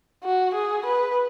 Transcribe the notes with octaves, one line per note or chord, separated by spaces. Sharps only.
F#4
G#4
B4